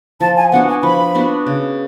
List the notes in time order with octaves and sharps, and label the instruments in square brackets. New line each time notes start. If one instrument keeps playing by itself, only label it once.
[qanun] F3 [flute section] A5
[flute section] G#5
[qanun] B3 D4 F#4 [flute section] F#5
[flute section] G#5
[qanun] F3 [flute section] B5
[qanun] B3 D4 F#4
C#3